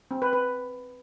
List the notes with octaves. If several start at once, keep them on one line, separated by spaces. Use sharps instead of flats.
C4
B4
B4